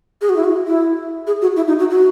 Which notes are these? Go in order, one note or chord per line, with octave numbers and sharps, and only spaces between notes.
G#4
F#4
E4
F#4
E4
G#4
F#4
E4
D#4
F#4
F#4